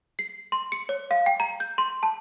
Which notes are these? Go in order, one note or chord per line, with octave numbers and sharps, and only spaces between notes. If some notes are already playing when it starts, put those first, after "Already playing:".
C7
C6
C#7
C#5
F5
G5
A#5
G6
C6
A5